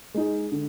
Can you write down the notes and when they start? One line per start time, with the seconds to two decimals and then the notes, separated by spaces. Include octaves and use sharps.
0.14 G#3 D#4 G#4
0.52 D3